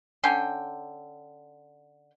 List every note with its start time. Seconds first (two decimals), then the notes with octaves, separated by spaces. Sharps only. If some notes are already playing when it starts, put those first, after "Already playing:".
0.24 D3 C#4 G5 C6